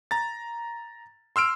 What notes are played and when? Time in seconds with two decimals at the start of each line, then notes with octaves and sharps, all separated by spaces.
0.11 A#5 A6
1.36 C6 E6 F6 D7